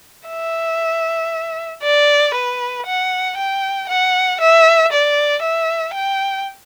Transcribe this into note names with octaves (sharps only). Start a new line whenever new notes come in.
E5
D5
B4
F#5
G5
F#5
E5
D5
E5
G5